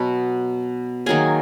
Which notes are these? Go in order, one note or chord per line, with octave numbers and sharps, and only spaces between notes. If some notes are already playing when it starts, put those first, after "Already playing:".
Already playing: B2 F#3 B3 F#4 F#5
D#3 F#3 A#3 G#4 G#5